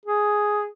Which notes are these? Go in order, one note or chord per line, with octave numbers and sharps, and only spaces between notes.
G#4